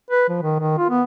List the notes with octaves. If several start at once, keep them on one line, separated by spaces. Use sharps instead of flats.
B4
F3
D#3
D#3
F4
B3